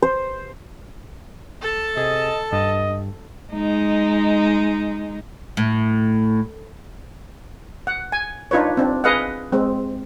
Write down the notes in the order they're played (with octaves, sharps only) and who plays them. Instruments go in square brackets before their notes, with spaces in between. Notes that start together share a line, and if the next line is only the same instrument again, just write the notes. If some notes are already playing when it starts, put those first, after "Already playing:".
[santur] C5
[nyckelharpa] A4 A5
[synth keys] C3 G#4 [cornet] D#5
[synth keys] G2 [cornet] D#5
[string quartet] G#3 D#4
[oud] A2
[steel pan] F#5
G#5
D4 D#4 F4 B4 C#5
C4 D4
G#4 B4 D#5 F5 F#5
G#3 C4